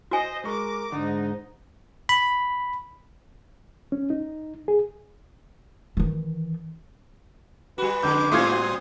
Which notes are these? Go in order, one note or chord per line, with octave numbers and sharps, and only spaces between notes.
F#4 C5 D#5 G#5
G#3 A#4 C#6 D6
G#2 D3 D#4
B5
C#4
D#4
G#4
D#3 E3
G3 F#4 B4
F2 D3 G#3 D6 G6
A2 G3 A3 C4 F4 C6 D#6 G#6
F#4